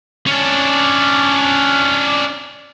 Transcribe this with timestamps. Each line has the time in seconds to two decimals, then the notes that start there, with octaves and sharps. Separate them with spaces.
0.27 C#4 D4